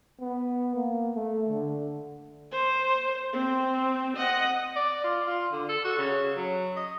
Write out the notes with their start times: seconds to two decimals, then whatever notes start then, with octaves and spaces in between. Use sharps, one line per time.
0.21 B3
0.75 A#3
1.15 A3
1.48 D3
2.51 C5
3.33 C4
4.17 D#5 F#5
4.76 D5
5.04 F4
5.27 F4
5.52 D3
5.69 A4
5.84 F#4
5.98 C#3
6.36 F#3
6.76 D#5